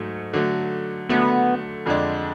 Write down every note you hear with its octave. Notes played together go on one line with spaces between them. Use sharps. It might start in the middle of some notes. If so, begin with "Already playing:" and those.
Already playing: G#2 F#3 A3
D3 F#3 A3
D3 F#3 A3 B3
F2 D3 G#3 D4